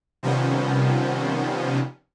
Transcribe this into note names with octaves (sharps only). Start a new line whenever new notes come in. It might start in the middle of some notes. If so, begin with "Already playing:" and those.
C3 D#3 F3 G3 B3 C#4